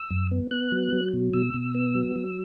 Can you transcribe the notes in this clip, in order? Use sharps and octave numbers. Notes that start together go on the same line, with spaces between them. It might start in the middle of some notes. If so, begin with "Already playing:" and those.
Already playing: E6
F#2
B3
B3 F#6
F#3
F#3
B2
B2 E6
B2
B3
F#3
F#3